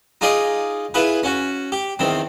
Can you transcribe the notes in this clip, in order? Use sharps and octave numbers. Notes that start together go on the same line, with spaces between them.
D#4 F4 G#4 D5 D#5
E4 F4 G#4 B4
C#4 F#4
G4
E2 D#3 C4